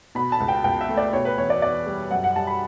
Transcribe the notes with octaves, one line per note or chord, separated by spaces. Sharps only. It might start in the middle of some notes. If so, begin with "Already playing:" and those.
B2 B5
A5
C#2
G5
C#2 G5
E5
A3
D5
B2 C#5
B4
E2 C#5
D5
E2 D5
G3
F#2 F#5
F#5
G3 A5
B5